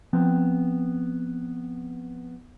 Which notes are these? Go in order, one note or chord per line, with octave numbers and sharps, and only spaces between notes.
F3 B3 C4 G5